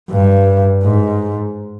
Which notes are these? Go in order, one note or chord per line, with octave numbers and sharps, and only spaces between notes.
G2
G#2